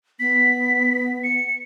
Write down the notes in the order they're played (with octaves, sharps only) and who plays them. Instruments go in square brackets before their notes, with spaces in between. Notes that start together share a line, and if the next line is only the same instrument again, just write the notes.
[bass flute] B3 [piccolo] B6
[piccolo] C#7